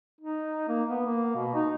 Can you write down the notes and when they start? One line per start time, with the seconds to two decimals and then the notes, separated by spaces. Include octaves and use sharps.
0.21 D#4
0.68 A#3
0.88 B3
1.05 A#3
1.36 B2
1.55 D#4